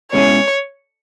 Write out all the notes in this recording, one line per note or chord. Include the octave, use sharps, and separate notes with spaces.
B2 G#3 C#4 E4 G#4 C#5